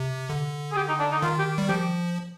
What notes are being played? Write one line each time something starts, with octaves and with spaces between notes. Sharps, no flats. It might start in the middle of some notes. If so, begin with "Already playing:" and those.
Already playing: C3
D3
G#4
G4
D#4
D4
D#4
D#3 F4
G4
G3
F3 G4